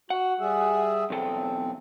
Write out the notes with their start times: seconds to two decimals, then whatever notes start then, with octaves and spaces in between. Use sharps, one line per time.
0.10 F#4 F#5
0.40 G3 G#4 E5
1.10 B1 E2 C4 A4